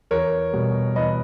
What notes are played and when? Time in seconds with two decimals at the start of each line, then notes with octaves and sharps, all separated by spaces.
0.11 E2 A#4 C#5
0.53 B2 G3
0.96 E2 B4 D#5